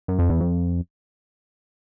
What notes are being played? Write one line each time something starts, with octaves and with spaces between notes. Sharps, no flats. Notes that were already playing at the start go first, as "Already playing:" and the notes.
F#2
F2
E2
F2